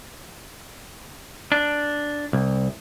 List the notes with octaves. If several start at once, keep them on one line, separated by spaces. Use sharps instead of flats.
D4
C2